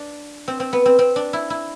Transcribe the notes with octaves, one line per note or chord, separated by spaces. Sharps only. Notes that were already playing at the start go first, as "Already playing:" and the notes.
Already playing: D4
C4
C4
B3
C4
C4
D4
E4
E4